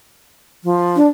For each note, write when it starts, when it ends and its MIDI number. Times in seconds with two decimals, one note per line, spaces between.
0.64 0.97 53
0.96 1.07 62